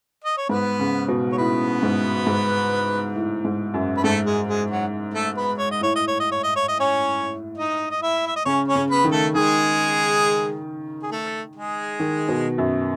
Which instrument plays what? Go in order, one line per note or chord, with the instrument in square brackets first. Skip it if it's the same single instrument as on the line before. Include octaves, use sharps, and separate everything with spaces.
[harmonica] D#5
C#5
[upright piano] G#2 [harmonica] B3 B4
[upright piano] C#3
B2
[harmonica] C#5
[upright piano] A2 [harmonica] B3 B4
[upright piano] G#2
G#2
A2
G#2
F#2
[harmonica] B4
[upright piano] G#2 [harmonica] A3 A4
[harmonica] G#3 G#4
G#3 G#4
F#3 F#4
A3 A4
B3 B4
C#5
D#5
[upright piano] A2 [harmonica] C#5
[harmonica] D#5
C#5
D#5
C#5
D#5
C#5
D#5
C#4 C#5
D#4 D#5
D#5
E4 E5
E5
D#5
[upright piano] C#3 [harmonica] C#4 C#5
[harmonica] C#4 C#5
[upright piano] C#3
[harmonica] B3 B4
[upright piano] D#3
[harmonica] A3 A4
[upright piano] D#3 [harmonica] G#3 G#4
[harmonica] G#4
A3 A4
G#3 G#4
[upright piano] D#3
B2
F#2